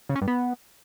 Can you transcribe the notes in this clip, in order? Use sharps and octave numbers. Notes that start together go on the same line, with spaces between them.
C#3
C#4
G2
B3